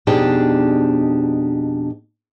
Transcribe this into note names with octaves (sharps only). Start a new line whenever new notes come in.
F2 B2 D4 D#4 G4 G#4